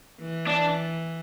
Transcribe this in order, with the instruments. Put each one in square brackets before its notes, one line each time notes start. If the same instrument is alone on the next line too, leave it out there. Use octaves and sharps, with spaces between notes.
[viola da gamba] E3
[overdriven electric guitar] D4